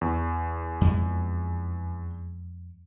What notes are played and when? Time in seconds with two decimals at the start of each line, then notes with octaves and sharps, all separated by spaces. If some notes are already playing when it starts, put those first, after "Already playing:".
0.01 E2
0.81 F2 G#3